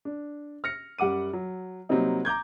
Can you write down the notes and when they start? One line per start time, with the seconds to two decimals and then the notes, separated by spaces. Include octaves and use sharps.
0.05 D4
0.64 F6 A#6 C#7
0.99 F#2 G3 F#5 D6 D#7
1.33 F#3
1.89 C3 F#3 G3 A#3 C4 D#4
2.25 A#5 D6 G6 G#6